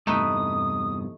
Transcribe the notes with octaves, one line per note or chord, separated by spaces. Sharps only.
E2 G2 C3 A3 D#4 B4 D#6